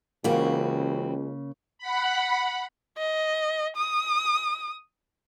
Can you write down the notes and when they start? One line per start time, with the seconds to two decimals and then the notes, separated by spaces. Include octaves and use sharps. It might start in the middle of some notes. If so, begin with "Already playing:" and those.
0.24 C#2 C#3 E3 A#3 C4 F#4
1.78 F#5 B5
2.98 D#5
3.76 D#6